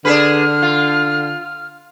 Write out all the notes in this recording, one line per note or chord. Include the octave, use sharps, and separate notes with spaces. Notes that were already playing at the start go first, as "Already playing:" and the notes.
D3 D4 G#4 B4 F6
F4